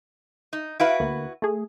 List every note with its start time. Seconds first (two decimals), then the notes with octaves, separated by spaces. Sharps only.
0.53 D#4
0.80 E4 F#4 B4 F5 D7
1.00 D2 A#3
1.42 A3 G#4